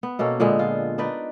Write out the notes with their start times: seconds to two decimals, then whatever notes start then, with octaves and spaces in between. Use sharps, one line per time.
0.03 B3
0.19 B2 A#3 C#4 A4
0.40 A#2 D3 G#3 B3
0.59 F4
0.98 D4 D#4 B4 D5